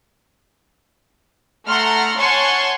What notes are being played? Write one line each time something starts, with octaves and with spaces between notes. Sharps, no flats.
A3 F#5 A#5 C6 F6
C#5 F#5 G#5 A5 C6 C#6